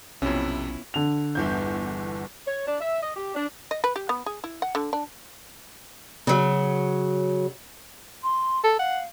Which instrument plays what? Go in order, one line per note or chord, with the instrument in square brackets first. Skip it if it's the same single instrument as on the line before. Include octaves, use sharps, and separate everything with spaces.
[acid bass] B1 [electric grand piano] F2 C3 [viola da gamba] B3 E4 F4 [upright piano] C#4
[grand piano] D3 F7
[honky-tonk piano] G1 E2 G6
[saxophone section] C#5
D4
E5
D#5
G4
D4
[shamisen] D#5
B4
G4
B3
G#4
E4
F#5
D3
D4
[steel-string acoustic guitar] C#3 F#3
[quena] C6
[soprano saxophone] A4
[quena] F5 [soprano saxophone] F#5